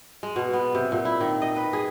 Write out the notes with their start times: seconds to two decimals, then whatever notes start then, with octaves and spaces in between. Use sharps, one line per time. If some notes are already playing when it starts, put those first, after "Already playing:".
0.23 G#3
0.36 B2
0.53 B3
0.75 C3
0.92 A#2
1.05 E4
1.21 D#3
1.42 D#5
1.56 B4
1.73 G#4